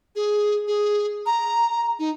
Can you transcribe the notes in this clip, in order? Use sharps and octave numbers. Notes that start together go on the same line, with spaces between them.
G#4
G#4
A#5
D#4